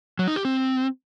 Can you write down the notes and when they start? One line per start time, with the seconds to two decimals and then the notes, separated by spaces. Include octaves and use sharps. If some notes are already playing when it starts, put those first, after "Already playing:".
0.19 F#3
0.28 D#4
0.36 G4
0.45 C4